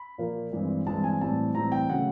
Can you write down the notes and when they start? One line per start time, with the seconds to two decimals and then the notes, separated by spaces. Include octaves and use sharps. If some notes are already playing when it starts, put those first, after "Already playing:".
Already playing: B5
0.18 A#2 F3 A#3
0.52 G2 E3 G#3 C4
0.86 G2 E3 G#3 C4 A5
1.04 G#5
1.21 A2 E3 G3 C4 A5
1.55 A2 E3 G3 C4 A#5
1.72 G5
1.90 C#3 F#3 A3 F#5